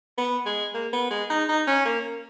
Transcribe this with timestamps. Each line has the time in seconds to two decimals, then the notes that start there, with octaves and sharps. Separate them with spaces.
0.18 B3
0.46 G#3
0.74 A#3
0.93 B3
1.11 G#3
1.30 D#4
1.49 D#4
1.67 C#4
1.85 A#3